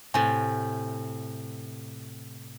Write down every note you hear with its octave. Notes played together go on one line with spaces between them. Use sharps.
A2 C3 G#5 A6